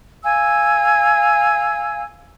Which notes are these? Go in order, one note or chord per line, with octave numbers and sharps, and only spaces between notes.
F5 G#5 E6